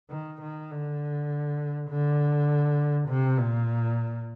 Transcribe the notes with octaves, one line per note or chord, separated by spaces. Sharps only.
D#3
D#3
D3
D3
C3
A#2